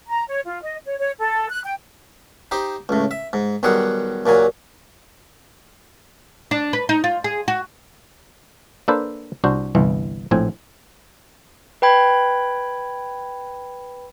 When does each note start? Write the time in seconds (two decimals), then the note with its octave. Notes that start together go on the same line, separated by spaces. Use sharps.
0.08 A#5
0.28 C#5
0.45 F4
0.62 D#5
0.85 C#5
0.99 C#5
1.18 A4
1.50 F#6
1.64 G5
2.51 D#4 G4 C5
2.89 C#2 A2
3.11 E5
3.33 G#2
3.63 B1 D#3 G3 G#4 F#5
4.26 D#2 A#2 F#3 G#5
6.51 D4
6.73 B4
6.89 D#4
7.04 F4
7.24 G#4
7.48 F#4
8.88 A#3 D4 A4 B4 C5
9.44 C2 D4 F#4 C5
9.75 G1 C2 E3
10.31 A#1 A2 C4 G#5
11.82 B4 G5 B5 G#6